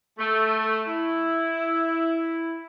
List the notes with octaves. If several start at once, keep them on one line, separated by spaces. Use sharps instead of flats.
A3
E4